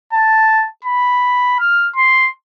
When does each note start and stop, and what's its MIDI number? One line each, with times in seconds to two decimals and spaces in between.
0.13 0.66 81
0.84 1.57 83
1.60 1.88 89
1.96 2.30 84